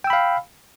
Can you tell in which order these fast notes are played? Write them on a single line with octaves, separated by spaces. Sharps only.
G5 E6 B5 F5